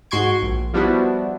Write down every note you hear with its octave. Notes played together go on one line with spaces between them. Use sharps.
G#2 F#4 C6 C#6 G#6 D7
A#1
F3 G3 B3 D4 E4 F#4